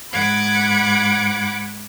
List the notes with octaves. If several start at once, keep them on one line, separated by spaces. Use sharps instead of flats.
G#2 F#5 B5 D6 G#6